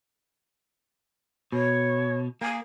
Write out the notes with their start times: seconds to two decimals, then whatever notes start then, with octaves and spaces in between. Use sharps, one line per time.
1.52 B2 C#5
2.41 A#3 G#5